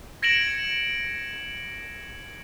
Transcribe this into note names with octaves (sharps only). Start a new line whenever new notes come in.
G#6 A#6 C#7 D7 E7 F#7